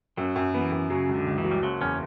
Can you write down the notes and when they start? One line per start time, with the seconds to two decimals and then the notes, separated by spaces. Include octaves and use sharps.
0.17 F#2 F#3
0.36 F#2
0.54 E3 B3
0.72 F#2
0.90 C#3 F#3
1.09 C#2
1.15 D3
1.27 C#2
1.38 E3
1.44 F#3
1.51 G3
1.62 F#1 F#3
1.81 E2 C#4